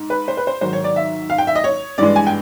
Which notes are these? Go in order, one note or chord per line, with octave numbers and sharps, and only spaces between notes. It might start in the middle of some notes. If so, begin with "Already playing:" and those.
Already playing: G#2
B4
C5
B4
C5
G#2 D#3 F#3 C5
C#5
D5
E5
F5
G5
E5
D#5
C#5
G2 E3 G#3 D5
G#5
G5